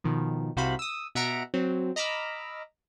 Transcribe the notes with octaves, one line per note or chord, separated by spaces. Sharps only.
B2 D#3 F3
C2 C3 F#4 C5 F5 B5
D#6 E6
B2 E5 F#5 A#5 D7
F#3 C4
D#5 A#5 B5 D6 E6 F6